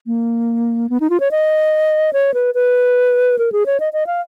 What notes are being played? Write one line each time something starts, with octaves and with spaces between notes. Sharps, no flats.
A#3
B3
D#4
F4
C#5
D#5
C#5
B4
B4
A#4
G#4
C#5
D#5
D#5
F5